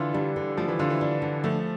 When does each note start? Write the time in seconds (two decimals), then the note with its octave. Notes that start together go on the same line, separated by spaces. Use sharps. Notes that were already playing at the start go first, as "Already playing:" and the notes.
Already playing: D3 E3 F4
0.14 G3 D4
0.36 D3
0.57 F3 A3
0.68 E3
0.79 D3 F4
0.90 E3
1.01 D4
1.22 D3
1.44 F3 A3